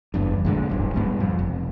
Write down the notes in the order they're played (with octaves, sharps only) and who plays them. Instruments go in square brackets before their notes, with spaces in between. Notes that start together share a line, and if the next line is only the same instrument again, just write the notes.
[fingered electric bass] F#1 E2 G2
A#1 G#2 D3
D1 B1 G2
G#2 B2 G3
F2
F1